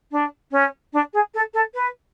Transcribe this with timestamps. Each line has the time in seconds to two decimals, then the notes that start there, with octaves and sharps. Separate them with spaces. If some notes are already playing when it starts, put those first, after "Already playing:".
0.11 D4
0.51 C#4
0.93 D4
1.13 G#4
1.34 A4
1.54 A4
1.74 B4